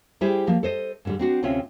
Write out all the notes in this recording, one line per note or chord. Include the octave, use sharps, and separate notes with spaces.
G3 E4 G4 G#4 C5
F3 A#3
A4 C5 D#5
G#2 D3 G3
C4 D4 F#4
D2 C3 C4 C#4 F4 E5